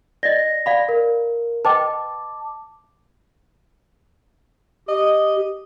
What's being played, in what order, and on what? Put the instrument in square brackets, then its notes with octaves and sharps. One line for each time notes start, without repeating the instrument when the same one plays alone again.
[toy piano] D5 D#5 [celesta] A#6
[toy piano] D5 F5 B5
[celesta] A#4
[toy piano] B4 D#5 G5 [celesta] A5 D6
[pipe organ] G4 [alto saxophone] D#5